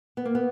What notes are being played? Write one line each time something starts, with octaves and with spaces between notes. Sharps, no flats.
B3
A#3
B3